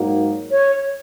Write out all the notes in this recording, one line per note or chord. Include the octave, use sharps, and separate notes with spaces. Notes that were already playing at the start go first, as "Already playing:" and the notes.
Already playing: G#2 F#3 A#3 D#4 F#4
C#5